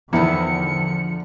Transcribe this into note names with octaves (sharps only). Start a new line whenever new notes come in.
E2 D3 D#3 F3 B3 E4 C#7